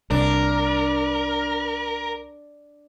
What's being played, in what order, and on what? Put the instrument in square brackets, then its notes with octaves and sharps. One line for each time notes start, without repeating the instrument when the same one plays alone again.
[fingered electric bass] C2 [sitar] D4 [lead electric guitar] A#4